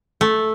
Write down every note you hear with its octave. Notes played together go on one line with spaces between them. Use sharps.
A3